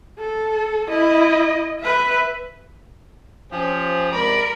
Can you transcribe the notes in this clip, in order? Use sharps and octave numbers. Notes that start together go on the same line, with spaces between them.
A4
E4 D#5
B4 E5
F3 C#4 G4 G#4 C5
C3 G#3 A#4 D5 B5